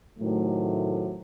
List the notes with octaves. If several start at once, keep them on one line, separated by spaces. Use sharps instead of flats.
A2 C3 D#3 F#3 A3